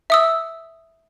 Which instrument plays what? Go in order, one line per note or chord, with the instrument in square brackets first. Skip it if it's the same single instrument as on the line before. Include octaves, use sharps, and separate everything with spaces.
[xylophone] E5 D#6 E6